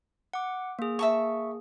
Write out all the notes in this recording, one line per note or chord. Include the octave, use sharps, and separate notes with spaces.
F#5 D6
A#3 G#4
E5 A5 C#6